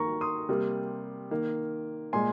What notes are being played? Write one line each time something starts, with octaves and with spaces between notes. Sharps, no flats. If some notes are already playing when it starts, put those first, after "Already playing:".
Already playing: D#3 A#3 A#5 C#6
C6 D#6
C3 G3 A#3
D#3 A#3
A#2 G#3 G#5 C6